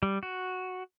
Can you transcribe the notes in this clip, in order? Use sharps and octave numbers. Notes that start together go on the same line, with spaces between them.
G3
F#4